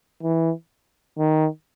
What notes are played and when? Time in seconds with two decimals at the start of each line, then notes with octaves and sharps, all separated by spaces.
0.23 E3
1.18 D#3